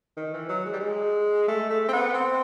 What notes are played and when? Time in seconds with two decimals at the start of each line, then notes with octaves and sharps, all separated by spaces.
0.17 D#3
0.34 E3
0.49 F#3
0.66 G#3
0.73 G3
0.80 G#3
1.48 A3
1.70 A3
1.88 C4
1.93 B3
2.14 C4